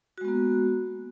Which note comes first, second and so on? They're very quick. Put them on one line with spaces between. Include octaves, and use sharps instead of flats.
F#4 G#3 B3 A#3